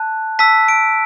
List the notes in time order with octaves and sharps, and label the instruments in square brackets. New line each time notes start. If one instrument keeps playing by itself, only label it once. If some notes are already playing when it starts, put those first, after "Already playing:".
Already playing: [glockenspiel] A5 F#6
A5 E6 B6
D7